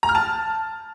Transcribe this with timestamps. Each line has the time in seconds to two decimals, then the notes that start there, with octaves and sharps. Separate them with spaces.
0.03 A#5
0.09 F6
0.15 A5